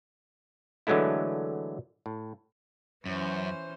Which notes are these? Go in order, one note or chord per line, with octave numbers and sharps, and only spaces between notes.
D3 E3 F#3 G#3 A3 E4
A2
F#2 E3 C#4 C5